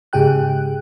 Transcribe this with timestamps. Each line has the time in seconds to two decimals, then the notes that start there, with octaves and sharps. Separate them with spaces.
0.13 G#2 C#3 G4 G#4 G5 F#6